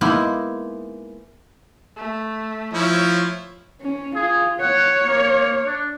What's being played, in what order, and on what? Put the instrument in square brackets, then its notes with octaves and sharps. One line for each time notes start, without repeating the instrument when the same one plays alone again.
[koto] G#3 A#3 B3 D#4 E4
[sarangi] A3
[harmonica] F3 E4 [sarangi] C#5
[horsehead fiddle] C#4
[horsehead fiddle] F4 [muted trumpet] G#4
[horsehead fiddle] C#5 [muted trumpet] F#5
[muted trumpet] A#3
D4